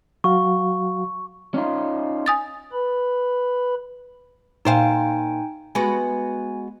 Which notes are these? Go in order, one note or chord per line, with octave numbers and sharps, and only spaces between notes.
F#3 F#4 F5 C#6
C#4 D#4 F4
G#5 D#6 A6
B4 B5
A#2 D#4 C5 F5 G5 G#5
G#3 B3 F#4 G#5